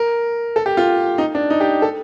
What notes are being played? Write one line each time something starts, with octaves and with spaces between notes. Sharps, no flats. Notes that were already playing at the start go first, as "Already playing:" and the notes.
Already playing: A#4
A4
G4
F4
D#4
D4
D#4
G4
A4